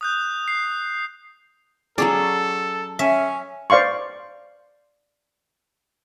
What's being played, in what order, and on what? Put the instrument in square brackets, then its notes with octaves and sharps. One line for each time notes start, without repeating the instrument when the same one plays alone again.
[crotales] D#6 F#6 G6
C7
[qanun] F#3 C#4 G#4 [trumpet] A4 [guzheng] D5
[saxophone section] C#4 [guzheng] E5
[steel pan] C5 D5 F5 C6 C#6